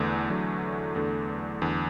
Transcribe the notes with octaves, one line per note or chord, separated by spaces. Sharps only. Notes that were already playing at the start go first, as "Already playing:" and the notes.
Already playing: E2 D3 A3
E2 D3 F#3
E2 D3 A3
E2 D3